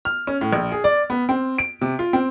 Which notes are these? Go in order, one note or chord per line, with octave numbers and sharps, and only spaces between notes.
F6
C#4
A2
A#1
G#4
D5
B3
C4
D7
C3
F4
C4